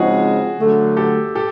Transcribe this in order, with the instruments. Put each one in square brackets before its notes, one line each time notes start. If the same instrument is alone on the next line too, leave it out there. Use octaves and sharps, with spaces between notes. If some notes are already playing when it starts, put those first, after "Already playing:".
Already playing: [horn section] C#3 F3 G#3 C4 D#4 [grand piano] F#4 G#4
[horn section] D3 F#3 A3
[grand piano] G4 A4
G4 A4